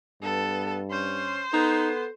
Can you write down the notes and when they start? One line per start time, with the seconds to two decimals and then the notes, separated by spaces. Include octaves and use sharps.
0.23 G2 B3 A4
0.91 C#4 C5
1.53 B3 D#4 A4